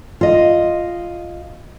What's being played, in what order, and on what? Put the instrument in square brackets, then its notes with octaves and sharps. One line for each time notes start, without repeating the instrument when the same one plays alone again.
[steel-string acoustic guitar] F4 D#5